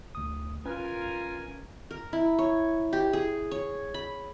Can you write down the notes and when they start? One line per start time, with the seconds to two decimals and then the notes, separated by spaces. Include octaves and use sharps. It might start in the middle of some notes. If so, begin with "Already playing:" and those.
0.15 D2 D#6
0.66 C#4 F4 A#4 B4 G#5
1.91 A#4
2.13 E4
2.39 C#5
2.93 G4
3.13 G#4
3.51 C#5
3.94 B5